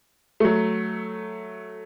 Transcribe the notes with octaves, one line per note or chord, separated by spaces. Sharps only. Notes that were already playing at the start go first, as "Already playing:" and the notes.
F#3 A3